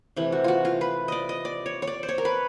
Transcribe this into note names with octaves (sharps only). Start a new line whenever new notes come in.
C3 E3 A3
F#4
F4 F#4
F4
B4
D5 D#5
D#5
D5
C#5
C#5
D5
C5
C#5
A#4
B4